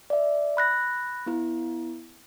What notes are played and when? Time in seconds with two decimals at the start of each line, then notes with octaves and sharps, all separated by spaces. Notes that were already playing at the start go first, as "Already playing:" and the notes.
0.10 D5 E5
0.57 B5 F#6 A#6
1.26 B3 E4